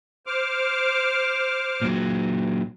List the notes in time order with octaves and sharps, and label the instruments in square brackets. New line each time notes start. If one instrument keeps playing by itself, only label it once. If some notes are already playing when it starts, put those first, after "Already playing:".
[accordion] C5 D6 F6
[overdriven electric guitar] A#2 F#3